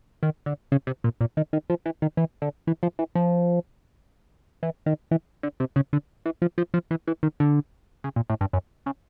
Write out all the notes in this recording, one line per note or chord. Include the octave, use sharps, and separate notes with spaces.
D#3
D3
C#3
C3
A#2
A#2
D#3
D#3
F3
E3
D#3
E3
D3
E3
F3
E3
F3
E3
D#3
E3
D3
C3
C#3
D3
E3
F3
F3
F3
E3
E3
D#3
D3
C#3
A#2
A2
G2
F#2
C#3